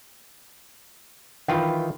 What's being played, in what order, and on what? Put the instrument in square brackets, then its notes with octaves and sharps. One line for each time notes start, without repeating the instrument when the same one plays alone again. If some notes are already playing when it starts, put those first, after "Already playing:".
[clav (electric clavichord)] D#3 E3 F4 [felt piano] G5 B5